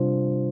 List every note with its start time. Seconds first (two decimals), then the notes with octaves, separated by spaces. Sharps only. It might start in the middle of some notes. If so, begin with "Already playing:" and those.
Already playing: C3 G3 D4 F4 C5